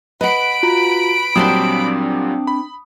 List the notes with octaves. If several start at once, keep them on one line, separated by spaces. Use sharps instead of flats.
B4 D#5 F#5 B5 D7
F4 F#4 A#5
A#2 F#3 G3 C4 D4 C5 D#6
B5